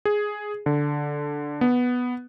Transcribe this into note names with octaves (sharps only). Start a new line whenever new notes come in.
G#4
D3
B3